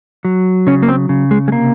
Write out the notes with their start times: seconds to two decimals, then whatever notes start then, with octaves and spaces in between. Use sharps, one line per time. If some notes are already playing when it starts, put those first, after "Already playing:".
0.25 F#3
0.67 C#3 C#4
0.83 A#3
0.88 C4
1.09 C#3
1.31 G#3
1.48 G#3
1.52 C3 A#3